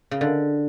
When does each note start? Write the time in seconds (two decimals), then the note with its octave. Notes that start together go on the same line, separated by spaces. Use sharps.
0.11 C#3
0.21 D3